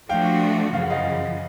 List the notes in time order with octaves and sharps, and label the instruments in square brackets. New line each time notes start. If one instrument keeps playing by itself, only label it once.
[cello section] F3 A3 D4 F#4 [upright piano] F5 G5
[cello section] F#2 C#3 F3 [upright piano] F5
[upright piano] F#5
D#5 F5